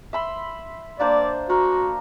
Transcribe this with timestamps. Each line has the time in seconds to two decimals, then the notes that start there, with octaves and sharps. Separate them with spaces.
0.13 E5 B5 C6
1.00 A#3 D4 C5 D5
1.50 F#4 A#4